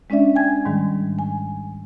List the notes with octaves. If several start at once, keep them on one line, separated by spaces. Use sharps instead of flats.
G#3 C#4 D4 D5 E5
G5 G#5 G#6
G#2 D#3 G3 G#3
G#5